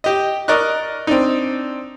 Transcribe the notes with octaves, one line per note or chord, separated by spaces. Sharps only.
G4 D#5
A#4 D5 D#5 C#6 F#6
C4 D4 D#4